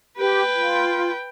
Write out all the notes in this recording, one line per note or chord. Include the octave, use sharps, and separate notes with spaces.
G4 B4 G5
F4